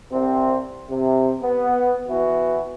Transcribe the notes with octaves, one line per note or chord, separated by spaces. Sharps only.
C2 C3 C4
C3
B3
E3 B3 E4 F#4